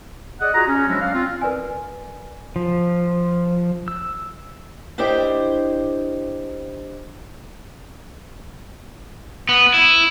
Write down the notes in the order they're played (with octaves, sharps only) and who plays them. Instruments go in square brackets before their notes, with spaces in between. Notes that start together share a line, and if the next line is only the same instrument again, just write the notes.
[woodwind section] G#4 D5 D#5 F#5
F4 F#4 G#4 A#5
C#4
F3 F#3 G#3 D4 E4 F#4
D5 F5 F#5
C4 F4
[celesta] A#4 B4 D5 G#5
[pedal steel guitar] F3
E6
[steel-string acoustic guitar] D4 E4 G4 C5 D#5 G5
[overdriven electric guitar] B3
E4